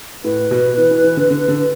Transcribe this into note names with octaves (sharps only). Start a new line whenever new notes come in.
A2 B4
B2
E3
E3
E3
D3
D3
D3